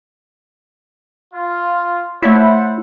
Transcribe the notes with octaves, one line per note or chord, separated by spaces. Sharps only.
F4
A3 E4 A4 C5 C#5 F#5 B6